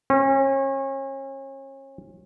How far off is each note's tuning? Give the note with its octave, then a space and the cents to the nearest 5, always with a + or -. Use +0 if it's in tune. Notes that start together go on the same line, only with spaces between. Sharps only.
C#4 -35